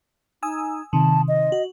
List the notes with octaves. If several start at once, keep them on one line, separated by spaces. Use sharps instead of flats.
D#4 G#5 D#6 E6
C3 D#3 A5
D#5
F#4